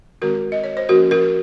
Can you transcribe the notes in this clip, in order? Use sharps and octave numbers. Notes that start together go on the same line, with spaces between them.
D#3 G#3 C4 F#4 A#4
D#5
C#5
C5
F3 A#3 C#4 F#4 A#4
F#4 A#4